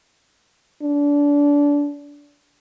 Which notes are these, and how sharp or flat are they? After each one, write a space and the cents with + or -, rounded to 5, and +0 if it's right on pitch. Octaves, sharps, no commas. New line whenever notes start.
D4 -25